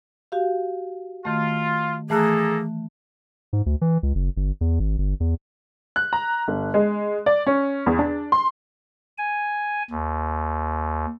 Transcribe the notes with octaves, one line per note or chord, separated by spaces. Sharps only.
F#4 G4 F5
D#3 A3 F4
E3 A3 A#3 G#4 A4 A#5 F#6
G#2
D2
E3
C#2
F#1
G1
E2
G#1
G1
E2
F#6
A#5
G1
G#3
D5
C#4
E2
D4
C6
G#5
D#2